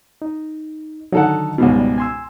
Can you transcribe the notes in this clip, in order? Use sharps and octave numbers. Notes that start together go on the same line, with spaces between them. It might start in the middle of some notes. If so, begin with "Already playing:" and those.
D#4
D3 D#3 F#3 D#4 A4 F#5
C#2 G#2 B2
G3
G#5 C6 E6